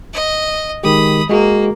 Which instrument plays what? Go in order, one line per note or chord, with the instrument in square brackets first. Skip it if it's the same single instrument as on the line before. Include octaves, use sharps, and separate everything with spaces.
[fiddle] D#5
[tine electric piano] D#3 G#3 G4 [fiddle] B5 D#6
[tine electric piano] G#3 F#4 G#4 [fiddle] A#3